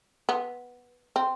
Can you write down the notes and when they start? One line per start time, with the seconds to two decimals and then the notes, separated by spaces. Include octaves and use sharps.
0.29 B3
1.16 C4